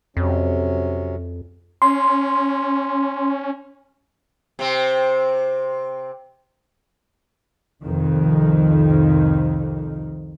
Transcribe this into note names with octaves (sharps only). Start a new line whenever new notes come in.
F2 C3 F#3 C#4
C#4 C6
C3 C4
C2 F2 D#3